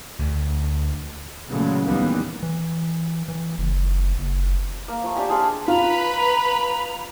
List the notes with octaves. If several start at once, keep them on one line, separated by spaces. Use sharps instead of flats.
D2
A#2 C#3 E3 F#3 G#3 A3
D#2 D#3 E3 G3 A#3 B3
E3
E3
F#1
F#1
A#3
F3 A3
D4 G4 E5 G#5
G#4 A4 C5 F5
F4 B4 A#5 B5